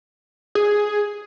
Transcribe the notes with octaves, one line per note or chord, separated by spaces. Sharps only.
G#4